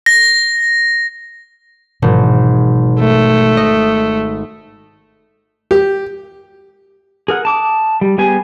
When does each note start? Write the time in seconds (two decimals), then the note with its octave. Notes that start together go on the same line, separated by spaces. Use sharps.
0.06 A#6
2.02 G#1 B2 E3 F#3
3.00 A3
3.57 D#5
5.71 G4
7.28 G#4 A#4 F#5
7.45 A5 D6 D#6
8.01 G3
8.18 G3 B3 G4 G#4 G#5